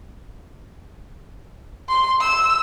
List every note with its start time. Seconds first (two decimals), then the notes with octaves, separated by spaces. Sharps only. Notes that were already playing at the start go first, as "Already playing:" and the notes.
1.89 C6
2.20 E6